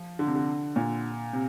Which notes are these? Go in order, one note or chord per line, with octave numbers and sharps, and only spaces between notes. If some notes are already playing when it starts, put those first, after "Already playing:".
Already playing: F3
D3
C3
D3
A#2
C3